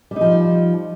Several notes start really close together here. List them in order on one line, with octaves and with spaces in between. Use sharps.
G3 D#4 F3